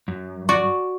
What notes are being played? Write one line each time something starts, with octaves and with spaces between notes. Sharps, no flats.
F#2
F#4 D5